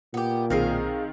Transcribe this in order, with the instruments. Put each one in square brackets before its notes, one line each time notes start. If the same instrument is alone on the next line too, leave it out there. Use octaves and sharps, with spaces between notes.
[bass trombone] A#2 [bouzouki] B3 G4
[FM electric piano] B1 [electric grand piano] D#3 C4 C7 [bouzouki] G#4 A#4 F5